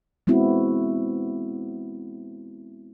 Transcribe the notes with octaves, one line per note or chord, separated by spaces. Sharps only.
G#3 B3 C4 E4 F#4